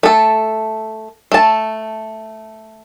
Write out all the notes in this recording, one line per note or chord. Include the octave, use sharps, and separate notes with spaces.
A3 A4
A3 A5